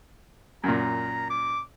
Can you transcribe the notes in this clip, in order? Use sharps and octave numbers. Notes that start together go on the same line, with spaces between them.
F#2 A#2 A#5
D6